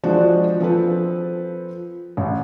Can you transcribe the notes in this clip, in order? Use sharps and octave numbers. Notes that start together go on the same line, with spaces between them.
F3 G#3 D4 F#4 C5 D5
F3 C4 A4 B4
A1